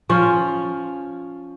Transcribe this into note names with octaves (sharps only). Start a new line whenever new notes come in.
F3 C#4